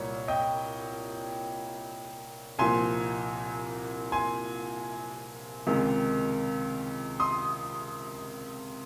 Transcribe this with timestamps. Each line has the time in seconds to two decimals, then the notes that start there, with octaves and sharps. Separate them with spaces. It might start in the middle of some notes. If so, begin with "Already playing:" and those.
Already playing: C2 A#2 G3 C#5
0.28 D#5 G5
2.59 C2 A#2 F3 G#5 C6
4.12 G#5 C6
5.66 C#2 C3 D#3 G#3
7.20 C6 D#6